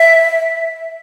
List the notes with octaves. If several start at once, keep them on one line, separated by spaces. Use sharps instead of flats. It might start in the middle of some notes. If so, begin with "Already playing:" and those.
Already playing: E5